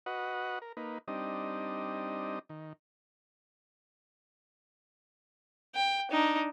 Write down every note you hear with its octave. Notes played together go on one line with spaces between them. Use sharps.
F#4 B4 D#5 F#5
A#4
A#3 D#4 B4
G3 C4 D4 D#4 D#5
D#3
G5
D4 D#4